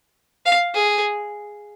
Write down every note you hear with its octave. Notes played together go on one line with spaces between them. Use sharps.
F5
G#4